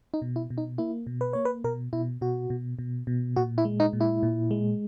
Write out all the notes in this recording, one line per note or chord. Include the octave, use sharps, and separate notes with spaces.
D#4
B2
E4
B2
D#4
A#3 E4
B2
B4
A#3 C#5
B4
B2 A#4
B2 E4
B2 F#4
B2
B2
B2
A#2 F#4
E4
G#3
D#4
A#2
E4
A#2
G#3